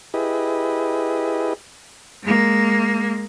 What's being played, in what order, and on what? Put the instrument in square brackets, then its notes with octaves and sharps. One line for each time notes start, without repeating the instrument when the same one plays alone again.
[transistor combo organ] E4 G4 G#4 B4 D#5
[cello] G#3 A#3